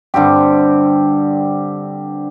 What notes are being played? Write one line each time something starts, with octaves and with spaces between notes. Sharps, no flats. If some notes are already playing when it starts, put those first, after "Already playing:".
G2 D3 C4 G4